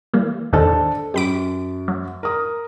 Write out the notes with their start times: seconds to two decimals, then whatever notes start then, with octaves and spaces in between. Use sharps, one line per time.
0.14 E3 G3 A#3
0.53 E2 A2 D#3 D4 A4 C5
1.14 F#2 G4 B5 D6
1.88 F#3
2.23 A#4 D#6